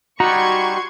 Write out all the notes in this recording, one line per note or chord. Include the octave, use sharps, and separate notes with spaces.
G3 D#4 F#4 A#5 C6 C#6 G#6